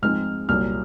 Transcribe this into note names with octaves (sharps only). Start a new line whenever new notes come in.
G#2 F3 G#3 C4 F6
C2 A#2 F#3 F6